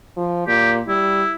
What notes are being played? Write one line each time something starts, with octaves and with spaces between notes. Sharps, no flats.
F3
A#2 G4
G3 E4